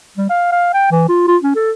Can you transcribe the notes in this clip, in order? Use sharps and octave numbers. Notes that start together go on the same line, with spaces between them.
G3
F5
F5
G5
E3
F4
F4
C#4
A4